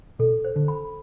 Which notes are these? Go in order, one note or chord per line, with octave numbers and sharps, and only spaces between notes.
B2 A4
C5
D3
B5